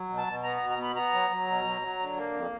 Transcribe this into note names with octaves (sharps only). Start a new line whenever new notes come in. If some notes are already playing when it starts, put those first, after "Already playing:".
Already playing: F#3
B2
A5
B2
B3 A#5
A#5
B2
A#5
B3 B5
B3 A#5
F#3
F#3
B2
F#3
F#3
D3
A#3
F2